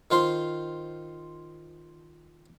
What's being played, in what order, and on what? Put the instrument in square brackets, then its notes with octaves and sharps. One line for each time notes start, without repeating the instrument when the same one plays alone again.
[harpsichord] D#3 F4 C5 C6